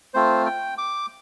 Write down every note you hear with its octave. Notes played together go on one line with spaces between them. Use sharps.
A3 C4 F4 C5
G5
D6